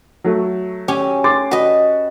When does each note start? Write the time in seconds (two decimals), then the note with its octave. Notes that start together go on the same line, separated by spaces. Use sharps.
0.24 F#3 A3
0.88 C#4 G4 G#5
1.24 C6 D6 A6
1.51 F#4 B4 D#5